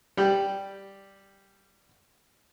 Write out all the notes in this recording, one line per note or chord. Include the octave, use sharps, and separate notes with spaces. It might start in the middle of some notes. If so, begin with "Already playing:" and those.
G3 G4